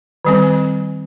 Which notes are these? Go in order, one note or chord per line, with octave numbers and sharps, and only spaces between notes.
D#3 G3 C4